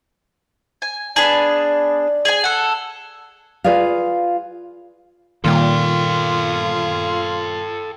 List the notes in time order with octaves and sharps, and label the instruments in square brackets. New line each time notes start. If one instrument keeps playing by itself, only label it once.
[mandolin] G#5
[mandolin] B3 D4 G#4 [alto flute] D5
[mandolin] G#4 G#5
A4 F#5
[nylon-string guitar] F4 G#4 B4 D5 F5
[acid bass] A#2 [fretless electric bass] D#3 G3 A#3 [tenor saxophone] F4 [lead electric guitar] A4 G5